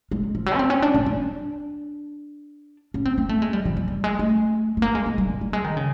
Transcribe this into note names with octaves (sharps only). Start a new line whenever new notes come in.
G#3
F3
F#3
C#4
C4
C#4
D4
D4
D4
C#4
C4
A#3
A3
G#3
G3
F3
G3
G3
G#3
A3
A3
A#3
G#3
G#3
G3
G3
G3
G#3
D#3
C#3